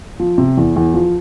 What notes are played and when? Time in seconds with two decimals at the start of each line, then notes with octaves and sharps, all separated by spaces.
0.20 F3
0.38 C3
0.58 E2
0.76 E2
0.94 F3